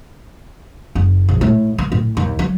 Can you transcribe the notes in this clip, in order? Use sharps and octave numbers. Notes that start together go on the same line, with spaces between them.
F#1
A#1
A2
A#3
A2
D#2
F#3